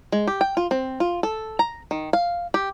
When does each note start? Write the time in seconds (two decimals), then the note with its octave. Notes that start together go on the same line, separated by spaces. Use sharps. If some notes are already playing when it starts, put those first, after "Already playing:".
0.12 G#3
0.27 G4
0.41 G5
0.57 F4
0.71 C4
1.00 F4
1.23 A4
1.59 A#5
1.91 D#3
2.13 F5
2.54 G4